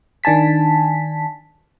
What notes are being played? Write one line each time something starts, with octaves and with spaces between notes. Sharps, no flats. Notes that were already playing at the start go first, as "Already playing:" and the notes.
D#3 D4 G#5 A5 B6